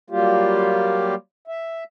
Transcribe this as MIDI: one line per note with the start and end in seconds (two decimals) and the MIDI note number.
0.10 1.15 54
0.10 1.15 55
0.10 1.15 58
0.10 1.15 65
0.10 1.15 67
1.48 1.84 76